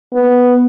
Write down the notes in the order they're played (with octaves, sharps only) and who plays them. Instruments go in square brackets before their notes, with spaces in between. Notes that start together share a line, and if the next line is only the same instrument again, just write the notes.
[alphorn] B3